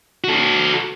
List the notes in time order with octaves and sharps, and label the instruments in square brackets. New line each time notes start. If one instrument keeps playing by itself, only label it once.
[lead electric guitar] F#4 A4